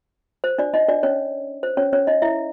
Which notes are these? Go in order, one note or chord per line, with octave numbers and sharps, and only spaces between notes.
C5
D4 D5
D#4 D#5
D4 D5
C#4 C#5
C5
C#4 C#5
C#4 C#5
D#4 D#5
E4 E5